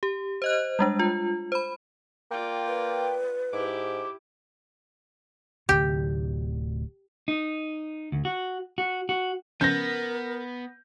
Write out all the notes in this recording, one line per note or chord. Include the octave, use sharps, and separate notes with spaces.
G4
C5 D#5 F#6
G3 G#3 D4
F4
C5 B5
A#3 F4 D5 G5
B4
G#2 E4 G4 D6
D1 D2 C3 G4
D#4
D2
F#4
F#4
F#4
C#3 F3 B3 C#4 A#4 G6 A#6